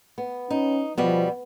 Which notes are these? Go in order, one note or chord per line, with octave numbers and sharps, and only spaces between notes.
B3
C#4 D#4
B2 F3 G3 B3